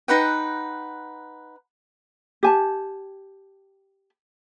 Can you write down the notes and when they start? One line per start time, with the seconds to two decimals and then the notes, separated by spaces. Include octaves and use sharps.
0.08 D#4 B4 F#5 G5
2.43 G4 G#5 A5